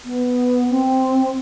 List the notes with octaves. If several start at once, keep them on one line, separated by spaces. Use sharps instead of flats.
B3
C4